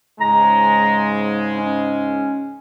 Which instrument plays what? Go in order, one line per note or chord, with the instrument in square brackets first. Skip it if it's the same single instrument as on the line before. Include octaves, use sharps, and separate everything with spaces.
[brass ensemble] G#2 C#3 G#3 [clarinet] A#5
[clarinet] C#4